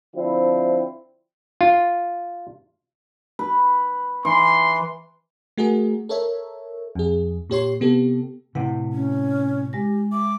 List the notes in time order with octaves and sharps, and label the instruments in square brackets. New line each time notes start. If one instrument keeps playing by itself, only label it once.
[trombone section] D3 F3 C4 E4
[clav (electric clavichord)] F4
[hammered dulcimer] B4
[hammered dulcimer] E3 [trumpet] C6
[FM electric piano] A3 F#4 G#4 A#4
A4 A#4 C#5 E5
F2 G#4
A#2 G4 C#5 C6
C3 B3 G4 A4
[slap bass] A2 C3 [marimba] E4 B4 F#5
[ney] C#4
[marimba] G#3 A#6 [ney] G4
[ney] E5 [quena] D6